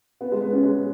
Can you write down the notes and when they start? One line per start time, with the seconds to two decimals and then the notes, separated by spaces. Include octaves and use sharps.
0.21 B3
0.32 G#3
0.41 B3
0.52 C#4
0.63 G#3